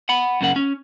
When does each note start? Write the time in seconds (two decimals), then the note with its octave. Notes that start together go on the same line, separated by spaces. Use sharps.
0.09 F#5 B5
0.41 F#2 C#3 A#3 F#5
0.56 C#4